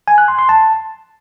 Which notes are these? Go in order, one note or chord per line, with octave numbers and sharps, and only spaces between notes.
G#5
F#6
C6
C6
A5